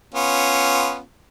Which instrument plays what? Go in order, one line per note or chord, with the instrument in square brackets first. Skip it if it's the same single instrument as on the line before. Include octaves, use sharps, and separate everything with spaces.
[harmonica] B3 C#4 F4